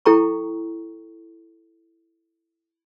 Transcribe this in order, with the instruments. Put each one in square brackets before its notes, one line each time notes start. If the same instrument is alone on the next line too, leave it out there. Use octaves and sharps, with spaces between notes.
[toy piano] E4 A4 G5 A#5 C#6